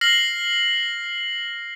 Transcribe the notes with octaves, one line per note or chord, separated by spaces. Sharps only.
F6 A#6 C7 F#7